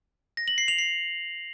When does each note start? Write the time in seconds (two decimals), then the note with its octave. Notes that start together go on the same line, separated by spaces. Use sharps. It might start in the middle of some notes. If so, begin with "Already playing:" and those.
0.37 A#6
0.48 F#7
0.58 C7
0.68 F7
0.78 C7